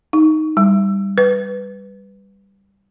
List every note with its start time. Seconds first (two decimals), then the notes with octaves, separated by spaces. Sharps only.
0.13 D#4
0.57 G3
1.18 B4